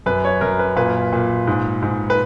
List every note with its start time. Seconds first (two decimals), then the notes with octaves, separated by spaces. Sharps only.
0.06 F#2 B4
0.25 C#5
0.41 F#2 A#4
0.59 B4
0.76 A#2 B4
1.13 A#2
1.47 G#2
1.82 G#2
2.10 B4